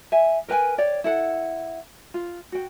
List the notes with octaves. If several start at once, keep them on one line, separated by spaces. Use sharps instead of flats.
E5 G#5
A#4 B4 G5 G#5
C#5 D5 G5
E4 A4 F#5
F4
F#4 G5